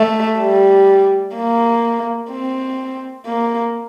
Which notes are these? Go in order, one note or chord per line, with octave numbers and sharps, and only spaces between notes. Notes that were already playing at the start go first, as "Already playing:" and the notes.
Already playing: A3
G3
A#3
C4
A#3